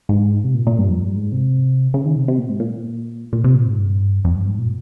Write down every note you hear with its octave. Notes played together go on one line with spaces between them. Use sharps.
G#2
C3
A#2
A#2
G2
F2
G2
G#2
C3
C#3
D#3
C3
C3
A#2
G#2
A#2
A#2
C3
A#2
G#2
G2
F2
G2
G#2
A#2